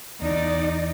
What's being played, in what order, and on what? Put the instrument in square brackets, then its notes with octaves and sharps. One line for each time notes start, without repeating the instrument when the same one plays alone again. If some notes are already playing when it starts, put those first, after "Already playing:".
[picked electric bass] E2 [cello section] D#4 [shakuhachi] D5